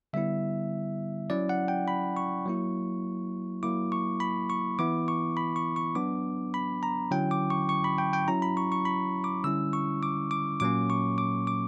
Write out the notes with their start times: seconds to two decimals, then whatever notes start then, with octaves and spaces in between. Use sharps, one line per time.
0.13 D3 G3 B3 E4 E5
1.30 F#3 C#4 E4 D5
1.49 F#5
1.68 G5
1.88 B5
2.17 C#6
2.46 F#3 A#3 E4
3.63 F#3 A#3 E4 D6
3.92 C#6
4.20 B5
4.50 C#6
4.79 E3 B3 E4 D6
5.08 C#6
5.37 B5
5.56 C#6
5.76 C#6
5.95 F#3 B3 D4 D6
6.54 B5
6.83 A#5
7.11 D3 F#3 C#4 E4 G5
7.31 D6
7.50 C#6
7.69 C#6
7.84 B5
7.98 G5
8.13 G5
8.28 F#3 C#4 E4 A#5
8.42 B5
8.57 C#6
8.72 C#6
8.85 B5
9.24 D6
9.44 D3 G3 C#4 E4 E6
9.73 C#6
10.03 D6
10.31 D6
10.60 A#2 F#3 A#3 C#4 D6
10.90 C#6
11.18 D6
11.47 D6